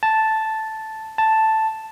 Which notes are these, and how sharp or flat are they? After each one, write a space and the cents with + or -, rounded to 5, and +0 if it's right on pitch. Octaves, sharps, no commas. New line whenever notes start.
A5 -5
A5 +0